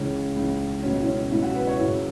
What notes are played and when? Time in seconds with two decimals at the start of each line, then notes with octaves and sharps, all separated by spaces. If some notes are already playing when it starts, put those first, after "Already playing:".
Already playing: C#2 C#3 E3 C#4
0.35 C#2 C#3 E3
0.82 C#2 B2 F#3 C#4
1.02 E4
1.07 C#4
1.31 C#2 B2 F#3 E4
1.43 F#4
1.55 B4
1.67 C#5
1.79 F#2 C#3 F#3 E4